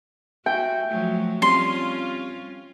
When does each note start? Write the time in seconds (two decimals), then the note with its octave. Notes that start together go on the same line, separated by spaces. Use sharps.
0.46 F#4 E5 G5
0.88 F3 F#3 A3
1.42 G3 C4 C#4 F4 C6